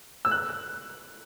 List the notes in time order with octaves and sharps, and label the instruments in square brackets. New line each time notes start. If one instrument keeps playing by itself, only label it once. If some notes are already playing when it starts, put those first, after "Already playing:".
[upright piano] E6
F#6